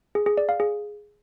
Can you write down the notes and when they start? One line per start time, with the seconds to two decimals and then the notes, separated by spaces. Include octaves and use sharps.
0.15 G#4
0.26 G#4
0.38 D5
0.49 F5
0.60 G#4